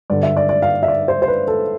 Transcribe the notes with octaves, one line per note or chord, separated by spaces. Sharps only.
G2 D3 D5
E5
D5
D5
F5
E5
D5
C5
C5
B4
A4